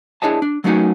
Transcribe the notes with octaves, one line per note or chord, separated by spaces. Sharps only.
D4 E4 G#4 C#5 D#5 A5
D4
F#3 A3 A#3 C#4 D#4 F#4